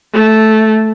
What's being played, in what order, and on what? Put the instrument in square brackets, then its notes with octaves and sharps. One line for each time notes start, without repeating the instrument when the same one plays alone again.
[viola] A3